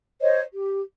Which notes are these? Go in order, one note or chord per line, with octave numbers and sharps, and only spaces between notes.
C5 C#5 D#5
G4